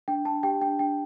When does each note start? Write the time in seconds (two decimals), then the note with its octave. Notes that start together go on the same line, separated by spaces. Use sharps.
0.08 D4 G5
0.25 D4 A5
0.43 G4 G5
0.61 D4 G5
0.79 D4 G5